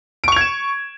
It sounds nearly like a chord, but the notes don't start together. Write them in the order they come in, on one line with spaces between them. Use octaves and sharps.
D7 C#6 F7 G#6 E7